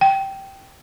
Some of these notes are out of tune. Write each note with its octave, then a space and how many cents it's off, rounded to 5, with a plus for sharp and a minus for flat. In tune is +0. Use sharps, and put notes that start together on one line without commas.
G5 -10